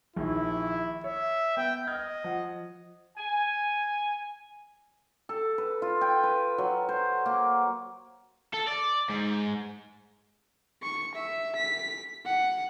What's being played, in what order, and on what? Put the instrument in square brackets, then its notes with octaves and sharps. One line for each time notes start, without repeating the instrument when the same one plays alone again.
[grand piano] A#1 D#3 F3 [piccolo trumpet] E4
[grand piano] C#5 [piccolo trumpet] E5
[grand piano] B3 [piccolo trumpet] G5
[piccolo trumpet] D#5 [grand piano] F6 G#6
[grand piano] F3 F#5
[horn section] G#5
[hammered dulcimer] A4
B4
F4
G5
B4
F#3
C5
A#3
[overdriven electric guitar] A4
D5
G#2
[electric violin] C#6
E5
B6
F#5